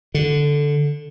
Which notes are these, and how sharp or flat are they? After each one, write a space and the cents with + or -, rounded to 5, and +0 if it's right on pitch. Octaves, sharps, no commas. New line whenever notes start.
D3 -5